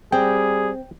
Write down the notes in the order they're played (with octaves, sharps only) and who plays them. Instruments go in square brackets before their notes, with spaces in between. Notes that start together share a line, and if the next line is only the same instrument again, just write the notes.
[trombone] G3 [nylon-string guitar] C4 [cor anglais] G#4 [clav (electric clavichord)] G5